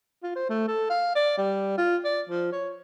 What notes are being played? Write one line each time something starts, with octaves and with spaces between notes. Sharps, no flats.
F4
C5
A3
A4
F5
D5
G3
F4
D5
F3
C#5